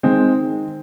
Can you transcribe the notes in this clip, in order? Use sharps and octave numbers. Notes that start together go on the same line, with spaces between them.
D#3 G#3 C4